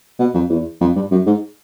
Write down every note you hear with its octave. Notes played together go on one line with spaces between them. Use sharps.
B2
F2
E2
F2
G2
F#2
G#2